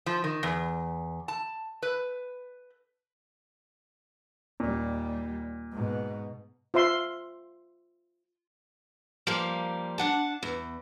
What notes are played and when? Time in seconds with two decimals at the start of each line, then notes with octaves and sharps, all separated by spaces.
0.06 F3
0.24 D#3
0.43 E2
1.28 A5
1.82 B4
4.60 D#2 A#2 G3
5.72 G#2 B2
6.74 F4 C5 E5 C6
9.27 F3 G3 A#3
9.98 D4 F#5 A5
10.43 E2